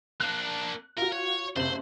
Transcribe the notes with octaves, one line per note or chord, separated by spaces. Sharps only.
A#3 D4 F#6
F4 F#4 A#4
C#5
F#1 C3 C5 F#7